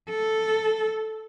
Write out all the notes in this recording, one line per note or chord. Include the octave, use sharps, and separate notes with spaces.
A4